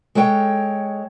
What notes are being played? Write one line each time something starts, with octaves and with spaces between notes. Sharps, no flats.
G#3 A4 C#5 G5